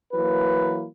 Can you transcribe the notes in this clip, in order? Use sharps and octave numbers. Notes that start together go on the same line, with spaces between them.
E3 F#3 A#3 B4